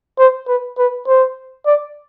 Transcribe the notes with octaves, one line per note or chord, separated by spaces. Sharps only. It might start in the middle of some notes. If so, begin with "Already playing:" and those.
C5
B4
B4
C5
D5